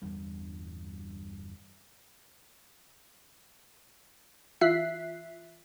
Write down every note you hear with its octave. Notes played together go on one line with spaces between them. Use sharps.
G1 E2 G2 G3
E3 F4 E5 F#6 B6 C7